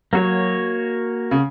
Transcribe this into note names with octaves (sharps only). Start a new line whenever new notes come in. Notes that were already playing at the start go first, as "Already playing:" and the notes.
F#3 A#3 F#4 C#5
C#3